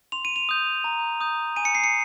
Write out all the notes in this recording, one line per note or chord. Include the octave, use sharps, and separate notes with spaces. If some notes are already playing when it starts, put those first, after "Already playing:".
C6 F7
D#7
F7
D#6 G6
A#5
D#6 G6
G#5 D#7
C#7
C7
C#7